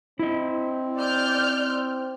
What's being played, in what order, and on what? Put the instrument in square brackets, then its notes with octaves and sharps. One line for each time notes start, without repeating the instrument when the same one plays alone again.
[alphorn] C4 [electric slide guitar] E4 D#5
[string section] D5 F6 G6